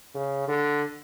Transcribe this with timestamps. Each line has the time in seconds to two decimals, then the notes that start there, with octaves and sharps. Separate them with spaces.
0.15 C#3
0.48 D3